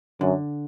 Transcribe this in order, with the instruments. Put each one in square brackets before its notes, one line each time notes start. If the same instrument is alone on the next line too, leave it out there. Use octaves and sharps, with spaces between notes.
[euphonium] F#2 [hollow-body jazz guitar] D3